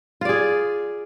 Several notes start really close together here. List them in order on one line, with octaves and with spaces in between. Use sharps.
F4 D5 G#4